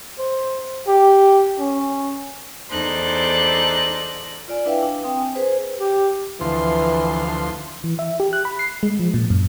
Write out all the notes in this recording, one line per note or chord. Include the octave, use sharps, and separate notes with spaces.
C5
G4
C#4
E2 D#4 A4 C5 D5 F#6
F4 D5 G#5
D4 E4 B4 E5 F5 G5
D4
C4 G5 D#6
G#5
G#4 B4 C5
G4
D2 E3 F3 C6
E3
E5
G4
F#6
B5
C7
G#3
F3
A#2
F#2